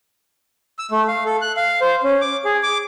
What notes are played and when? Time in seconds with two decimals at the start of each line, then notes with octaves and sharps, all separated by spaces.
0.79 E6
0.91 A3
1.08 F5
1.26 A4
1.41 F#6
1.57 F5
1.81 C5
2.03 C#4
2.21 D6
2.45 G#4
2.63 D6